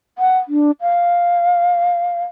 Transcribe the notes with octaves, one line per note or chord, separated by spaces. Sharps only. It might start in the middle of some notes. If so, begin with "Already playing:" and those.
F#5
D4
F5